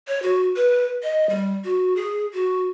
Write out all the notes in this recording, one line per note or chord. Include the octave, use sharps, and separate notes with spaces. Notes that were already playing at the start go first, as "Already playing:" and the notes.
C#5
F#4
B4
D#5
G3
F#4
G#4
F#4